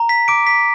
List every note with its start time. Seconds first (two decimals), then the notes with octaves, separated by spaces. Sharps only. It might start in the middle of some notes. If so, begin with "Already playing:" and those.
Already playing: A#5
0.09 B6
0.28 D6 D7
0.47 B6